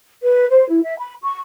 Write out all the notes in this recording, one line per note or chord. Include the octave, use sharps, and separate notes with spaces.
B4
C5
E4
E5
B5
C#6